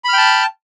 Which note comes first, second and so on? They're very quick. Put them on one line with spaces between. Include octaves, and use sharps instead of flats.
B5 F6 G5 A5